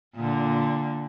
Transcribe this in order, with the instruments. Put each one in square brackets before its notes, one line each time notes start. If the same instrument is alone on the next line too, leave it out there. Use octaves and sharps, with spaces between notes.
[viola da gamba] A#2 D3